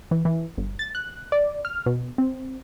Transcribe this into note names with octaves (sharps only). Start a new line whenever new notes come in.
E3
E3
G1
A6
F#6
D5
F6
B2
C4